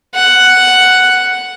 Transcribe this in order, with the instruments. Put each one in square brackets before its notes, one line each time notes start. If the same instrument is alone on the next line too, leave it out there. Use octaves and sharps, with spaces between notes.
[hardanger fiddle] F#5